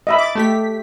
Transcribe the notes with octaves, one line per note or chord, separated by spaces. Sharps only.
D#5 E5 B5
D6 A6
A3 G4 B6